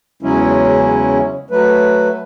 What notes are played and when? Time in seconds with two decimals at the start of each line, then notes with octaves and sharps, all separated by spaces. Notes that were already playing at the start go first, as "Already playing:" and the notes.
0.23 E2 C#3 F#3 G#3 C#4 E4
1.51 F#3 A3 B4